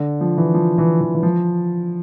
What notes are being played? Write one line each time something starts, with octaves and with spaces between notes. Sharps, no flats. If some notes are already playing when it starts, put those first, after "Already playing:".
Already playing: D3
F3
E3
F3
E3
E3
E3
F3